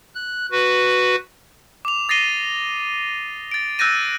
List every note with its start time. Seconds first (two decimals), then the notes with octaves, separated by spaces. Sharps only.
0.15 F#6
0.52 F#4 B4
1.85 D6 F7
2.09 D#6 A6 A#6 C7 D#7 G7
3.52 A6 D7
3.79 E6 F#6 G6 A6 A#6 D#7